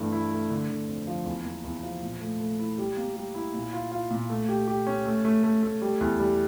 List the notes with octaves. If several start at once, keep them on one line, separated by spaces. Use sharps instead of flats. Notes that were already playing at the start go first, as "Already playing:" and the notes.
Already playing: G2 E3 A3
E4
A3
D3
D3
F2
F3
E2
A#3
E2
F3
A#2
A3
A3
E4
G3
A#3
G3
E4
A#2
F4
F4
A#2
A3
G4
G4
C#4
A3
A3
A3
A3
G3
E2
G3